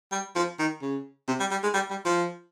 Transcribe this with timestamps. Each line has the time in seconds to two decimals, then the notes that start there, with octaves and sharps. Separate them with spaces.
0.12 G3
0.35 F3
0.59 D#3
0.82 C#3
1.28 C3
1.40 G3
1.51 G3
1.63 G#3
1.74 G3
1.90 G3
2.05 F3